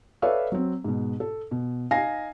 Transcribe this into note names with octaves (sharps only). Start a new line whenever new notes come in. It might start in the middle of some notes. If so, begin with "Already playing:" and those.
A4 B4 C#5 D5 E5 F5
F#3 C4
G#2 B2
A4
B2
D#4 F5 G#5 A#6 C7